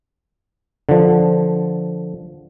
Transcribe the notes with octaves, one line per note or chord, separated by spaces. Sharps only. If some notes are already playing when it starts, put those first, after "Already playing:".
D3 F3